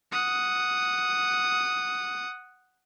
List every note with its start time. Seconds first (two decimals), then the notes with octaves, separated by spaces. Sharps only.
0.12 F#5 D#6